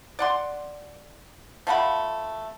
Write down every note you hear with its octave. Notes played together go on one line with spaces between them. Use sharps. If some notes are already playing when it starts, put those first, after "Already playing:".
D5 F#5 C6
F3 A3 F#5 B5